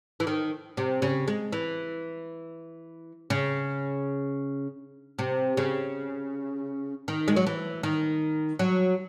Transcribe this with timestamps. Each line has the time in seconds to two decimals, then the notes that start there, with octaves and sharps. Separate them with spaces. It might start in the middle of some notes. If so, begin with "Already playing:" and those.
0.20 E3
0.27 D#3
0.77 C3
1.02 C#3
1.28 G#3
1.53 E3
3.30 C#3
5.19 C3
5.57 C#3
7.08 D#3
7.28 G#3
7.36 F#3
7.46 E3
7.83 D#3
8.59 F#3